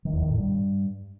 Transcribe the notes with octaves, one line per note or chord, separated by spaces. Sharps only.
D#3
E2
D#3
A2
G2